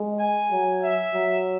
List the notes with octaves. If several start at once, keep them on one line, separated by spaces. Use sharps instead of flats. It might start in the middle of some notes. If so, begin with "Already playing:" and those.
Already playing: G#3
G#5
F#3
E5
F#3